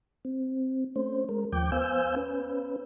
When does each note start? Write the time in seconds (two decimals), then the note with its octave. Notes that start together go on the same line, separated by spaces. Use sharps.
0.25 C4
0.96 A3 C#4 C5
1.29 G#3 A#4
1.53 D#2 F3 G5 D6 G6
1.72 B3 C5 F5 G#5 E6 G6
2.16 C#4 B4